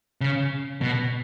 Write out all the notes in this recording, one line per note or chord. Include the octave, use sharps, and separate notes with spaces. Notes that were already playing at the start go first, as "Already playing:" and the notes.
C#3
B2